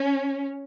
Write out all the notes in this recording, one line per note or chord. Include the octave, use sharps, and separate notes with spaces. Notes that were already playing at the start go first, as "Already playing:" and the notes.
Already playing: C#4